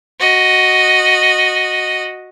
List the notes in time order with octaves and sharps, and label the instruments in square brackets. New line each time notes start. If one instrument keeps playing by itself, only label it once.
[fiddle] F#4 D#5